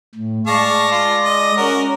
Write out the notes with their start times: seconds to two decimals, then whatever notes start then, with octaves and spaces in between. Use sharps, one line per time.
0.15 A2
0.47 G#3 D5 F5 A5 C#6 A#6
0.92 F4
1.25 D#5
1.57 C#4 F#4 A#4